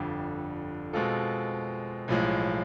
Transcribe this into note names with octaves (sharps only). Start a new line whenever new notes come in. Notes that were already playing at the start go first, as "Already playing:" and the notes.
Already playing: G1 F2 D3 G3
B2 G#3 C4 F4 A4
B1 A2 F3 G#3